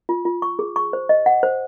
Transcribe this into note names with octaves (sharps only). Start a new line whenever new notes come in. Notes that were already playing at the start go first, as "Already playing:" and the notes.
F4
F4
C#6
G#4
C#6
C5
D#5
F#5
C5